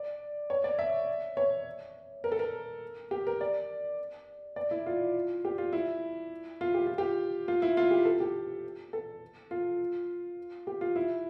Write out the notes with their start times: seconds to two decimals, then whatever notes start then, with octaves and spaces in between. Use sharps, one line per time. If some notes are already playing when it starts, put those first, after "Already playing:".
Already playing: D5
0.50 C#5
0.64 D5
0.79 E5
1.37 C#5
2.24 A#4
2.32 A4
2.39 A#4
3.11 G4
3.27 A#4
3.41 D5
4.56 D5
4.71 E4
4.86 F4
5.45 G4
5.58 F4
5.73 E4
6.61 F4
6.74 G4
6.87 F4
6.98 G4
7.48 F4
7.62 E4
7.77 F4
7.91 G4
8.05 A4
8.20 G4
8.93 A4
9.51 F4
10.67 G4
10.81 F4
10.96 E4